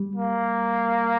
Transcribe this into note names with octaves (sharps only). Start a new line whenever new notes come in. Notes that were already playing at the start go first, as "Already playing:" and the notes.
Already playing: G3
A#3